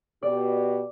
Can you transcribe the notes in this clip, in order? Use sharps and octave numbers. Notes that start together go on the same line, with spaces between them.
B2 G4 D5